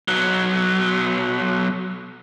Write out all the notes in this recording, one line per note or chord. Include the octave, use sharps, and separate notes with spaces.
B1 F#3